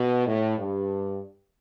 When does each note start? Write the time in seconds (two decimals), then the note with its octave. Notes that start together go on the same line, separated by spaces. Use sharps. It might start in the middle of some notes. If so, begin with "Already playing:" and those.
Already playing: B2
0.26 A2
0.57 G2